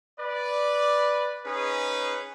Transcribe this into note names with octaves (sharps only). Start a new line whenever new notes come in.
B4 D5
C#4 D#4 G#4 B4